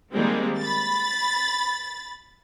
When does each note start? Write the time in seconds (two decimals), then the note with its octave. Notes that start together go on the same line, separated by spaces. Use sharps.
0.14 D#3 G3 G#3 A#3 C4
0.60 B5 A6